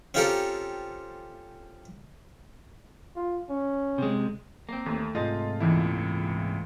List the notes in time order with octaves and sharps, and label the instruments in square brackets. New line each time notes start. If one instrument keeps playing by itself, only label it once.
[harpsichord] C4 C#4 F4 G4 A4 A#4
[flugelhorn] F4
C#4
[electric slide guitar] C3 G#3
[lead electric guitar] A#3 C4
[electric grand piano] D#2 [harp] A3
[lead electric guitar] G#2 C3 [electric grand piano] F4 [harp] D#5 A5
[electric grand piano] C#2 A#2 E4 [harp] E3